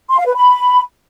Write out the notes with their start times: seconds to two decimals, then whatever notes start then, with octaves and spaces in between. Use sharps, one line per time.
0.09 C6
0.18 F5
0.26 B4
0.35 B5